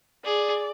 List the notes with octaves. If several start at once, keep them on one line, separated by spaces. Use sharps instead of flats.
G#4 D5